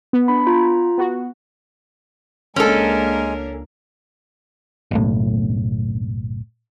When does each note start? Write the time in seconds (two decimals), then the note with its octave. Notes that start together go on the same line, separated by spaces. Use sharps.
0.13 B3
0.28 D4 B5
0.47 F4 A#5
0.98 B3 F#4
2.56 C#2 G#3 A#3 C#4 D4 A4 A#4 G#5
4.91 F#1 B1 A2